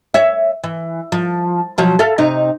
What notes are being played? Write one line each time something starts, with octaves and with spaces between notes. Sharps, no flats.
C#5 E5
E3
F3
B2 F3 F#3
A4 E5 F5
C3 D#4